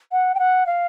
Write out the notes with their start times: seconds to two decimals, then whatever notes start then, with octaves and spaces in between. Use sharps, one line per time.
0.12 F#5
0.35 G5
0.39 F#5
0.66 F5